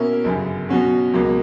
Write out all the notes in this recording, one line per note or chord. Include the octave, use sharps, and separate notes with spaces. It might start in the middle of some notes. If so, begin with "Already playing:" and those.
Already playing: B2 A#3 C#4 E4 A#4
G1 F#2 C#3
B2 F#3 C#4 F#4
C#2 B2 F#3 A#3